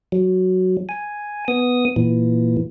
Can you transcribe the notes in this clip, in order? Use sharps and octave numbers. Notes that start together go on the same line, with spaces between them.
F#3
G#5
B3 D#6
A#2 E3